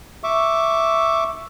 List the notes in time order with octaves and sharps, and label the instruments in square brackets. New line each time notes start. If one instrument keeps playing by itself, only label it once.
[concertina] E5 C#6 D6